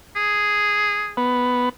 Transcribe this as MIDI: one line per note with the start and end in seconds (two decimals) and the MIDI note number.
0.16 1.13 68
1.17 1.69 59